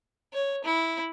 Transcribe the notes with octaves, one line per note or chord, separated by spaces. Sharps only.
C#5
E4